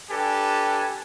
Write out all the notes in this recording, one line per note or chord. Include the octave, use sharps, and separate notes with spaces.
D4 G4 A4 B4 G#5 A5